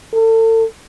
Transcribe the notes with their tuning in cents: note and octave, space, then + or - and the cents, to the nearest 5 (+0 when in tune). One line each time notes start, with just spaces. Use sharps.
A4 +35